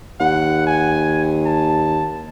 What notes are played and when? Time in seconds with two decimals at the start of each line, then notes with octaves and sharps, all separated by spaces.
0.20 D#2 F#5
0.66 G#5
1.45 A5